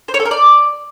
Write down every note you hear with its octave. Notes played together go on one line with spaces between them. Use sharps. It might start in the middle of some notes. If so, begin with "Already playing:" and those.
C5
C#5
A4
A#4
D5